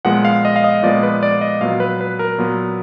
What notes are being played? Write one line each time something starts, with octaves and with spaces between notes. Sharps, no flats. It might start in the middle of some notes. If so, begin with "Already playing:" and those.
A#2 F3 G#3 B3 F#5
F5
D#5
F5
D#5
A#2 F3 G#3 B3 D5
B4
D5
D#5
A#2 F#3 B3 F5
B4
B4
A#4
A#2 F#3 B3